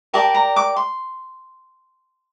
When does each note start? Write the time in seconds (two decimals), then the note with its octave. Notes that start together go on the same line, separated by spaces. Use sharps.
0.14 G4 A#4 D5 A5
0.35 A#5
0.56 D6
0.77 C6